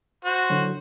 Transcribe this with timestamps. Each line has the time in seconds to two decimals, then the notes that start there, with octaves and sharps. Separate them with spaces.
0.25 F#4 C5
0.50 D3 F#3